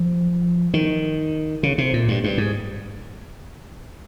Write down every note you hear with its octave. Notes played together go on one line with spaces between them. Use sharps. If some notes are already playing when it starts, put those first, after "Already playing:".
Already playing: F3
D#3
C#3
C3
A#2
G2
G2
G#2